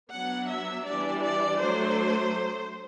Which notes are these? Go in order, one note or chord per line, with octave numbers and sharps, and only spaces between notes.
F#3 B3 D4 F#5
E5
E3 G3 D4 D5
D5
F#3 A3 D4 C5